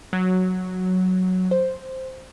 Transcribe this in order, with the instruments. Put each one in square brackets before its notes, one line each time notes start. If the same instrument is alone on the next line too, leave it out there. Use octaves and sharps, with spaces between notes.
[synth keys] F#3
C5